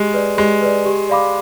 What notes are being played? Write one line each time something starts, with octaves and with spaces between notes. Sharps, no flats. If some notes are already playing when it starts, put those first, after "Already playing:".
Already playing: G#3 G4
B4 D5
G#3 G4
B4 D5
G4
D5 F5 B5 D6